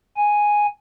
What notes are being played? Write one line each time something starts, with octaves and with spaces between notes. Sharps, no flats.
G#5